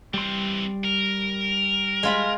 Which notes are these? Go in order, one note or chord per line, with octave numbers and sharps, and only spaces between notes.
E3 G3 C4 C6
A#4
G#3 F4 B5